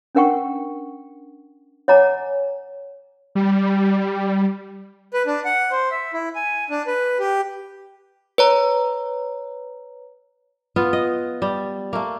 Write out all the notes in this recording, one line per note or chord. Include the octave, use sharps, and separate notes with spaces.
C#4 D4 A#4 F#5 G5 C#6
C#5 D#5 F#5 G#5 A#5 D6
G3
B4
D4
F#5
C5
E5
E4
G#5
D4
B4
G4
B4 C#5 A#5
B3 F4
D#5
G3
A3 A#3